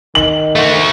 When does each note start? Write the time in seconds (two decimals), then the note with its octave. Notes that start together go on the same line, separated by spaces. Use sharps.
0.15 D#3 F#7
0.56 A3 F#4